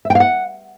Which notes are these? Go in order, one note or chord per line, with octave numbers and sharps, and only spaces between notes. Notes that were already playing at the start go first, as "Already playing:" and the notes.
E5
G5
F5
F#5